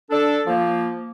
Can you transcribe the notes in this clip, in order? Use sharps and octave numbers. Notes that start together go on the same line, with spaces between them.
D4 A4
F3 A#3